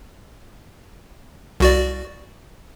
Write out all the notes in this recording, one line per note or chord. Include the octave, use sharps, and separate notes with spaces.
C2 F#4 D5